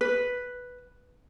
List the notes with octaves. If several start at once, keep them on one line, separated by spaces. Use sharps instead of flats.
B4